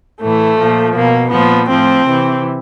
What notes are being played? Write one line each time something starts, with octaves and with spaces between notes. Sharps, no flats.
A2 E3 A3
A#2 F3
B2 A#3
A#2 F3 B3
A2 F3 C4
C3 E3